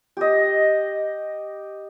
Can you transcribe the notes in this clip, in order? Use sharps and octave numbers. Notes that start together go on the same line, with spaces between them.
G4 D#5